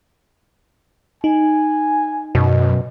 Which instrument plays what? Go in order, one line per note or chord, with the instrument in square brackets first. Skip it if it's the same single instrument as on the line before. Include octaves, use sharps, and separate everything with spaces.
[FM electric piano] D#4 [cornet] G#5
[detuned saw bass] F#2 [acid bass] B2